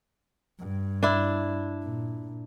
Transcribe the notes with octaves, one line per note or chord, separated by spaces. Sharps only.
G2
D4 E4
A#2